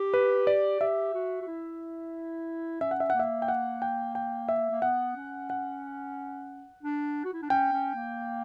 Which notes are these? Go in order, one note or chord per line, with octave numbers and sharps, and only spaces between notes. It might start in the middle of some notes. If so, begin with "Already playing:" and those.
Already playing: G4
B4
D5
G4 E5
F#4
F#4
E4
C#4 E5
F#5
E5
F#5
A#3
E5
G5
F#5
G5
G5
E5
A#3
B3 F#5
C#4
F#5
D4
F#4
E4
D4
C#4 G5
C#4
A#3